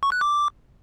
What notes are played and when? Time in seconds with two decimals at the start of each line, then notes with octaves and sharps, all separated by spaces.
0.03 C#6
0.12 F#6
0.21 D6